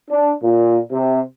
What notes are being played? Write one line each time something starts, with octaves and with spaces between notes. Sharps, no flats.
D4
A#2
C3